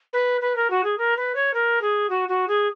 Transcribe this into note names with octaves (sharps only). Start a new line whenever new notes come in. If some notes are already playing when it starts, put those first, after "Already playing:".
B4
B4
A#4
F#4
G#4
A#4
B4
C#5
A#4
G#4
F#4
F#4
G#4